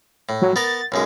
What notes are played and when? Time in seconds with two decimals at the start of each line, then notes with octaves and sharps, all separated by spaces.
0.29 A2
0.42 F#3
0.56 B3 A#4 A6
0.92 B1 F#2 G#3